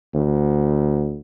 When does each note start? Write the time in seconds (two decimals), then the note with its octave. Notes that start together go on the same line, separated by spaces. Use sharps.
0.14 D2